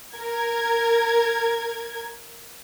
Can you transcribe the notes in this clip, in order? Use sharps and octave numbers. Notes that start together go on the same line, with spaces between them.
A#4 G#6